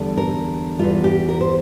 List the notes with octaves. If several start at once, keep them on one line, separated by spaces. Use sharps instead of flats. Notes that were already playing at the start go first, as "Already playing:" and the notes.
Already playing: E2 D3 G3
A#4
E2 E3 G3 F4
G4
A#4
C5